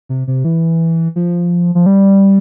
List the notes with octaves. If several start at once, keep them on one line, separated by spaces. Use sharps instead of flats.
C3
C3
E3
F3
F3
G3